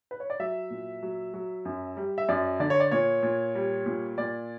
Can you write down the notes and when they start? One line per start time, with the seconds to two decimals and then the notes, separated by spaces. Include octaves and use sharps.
0.11 B4
0.20 C#5
0.30 D5
0.40 F#3 E5
0.70 A#2
1.02 F#3
1.34 F#3
1.65 F#2
1.97 G3
2.18 E5
2.28 F#2 D5
2.60 D3 D5
2.70 C#5
2.80 D5
2.91 A#2 C#5
3.23 A#2
3.55 G3
3.86 A#2
4.18 A#2 D5